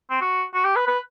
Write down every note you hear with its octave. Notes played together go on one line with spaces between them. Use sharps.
C4
F#4
F#4
G4
B4
B4